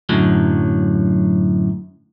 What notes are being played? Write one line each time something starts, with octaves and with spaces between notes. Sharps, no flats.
F#2 A2 D3 F#3